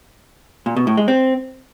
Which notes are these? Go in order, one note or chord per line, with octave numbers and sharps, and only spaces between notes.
A#2
B2
A2
G#3
C4